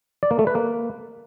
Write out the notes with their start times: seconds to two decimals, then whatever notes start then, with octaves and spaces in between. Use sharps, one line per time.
0.23 D5
0.31 A#3
0.39 A3
0.47 B4
0.55 A#3